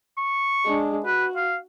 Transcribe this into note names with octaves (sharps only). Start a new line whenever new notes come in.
C#6
G#3 D4
F#4 B4
F5